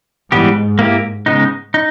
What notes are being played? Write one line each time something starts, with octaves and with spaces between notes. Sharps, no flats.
G#2 E3 G3 B3 G4
A#3 E4 G4
C#3 G#3 B3 D#4
D#4